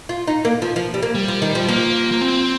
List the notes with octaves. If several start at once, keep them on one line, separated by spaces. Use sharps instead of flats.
F4
D#4
A#3
F3
F3
G3
A#3
G3
F3
D#3
F3
F3 A#3
A#3
C4